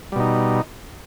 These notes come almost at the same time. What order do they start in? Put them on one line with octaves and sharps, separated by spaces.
G3 B2 D#4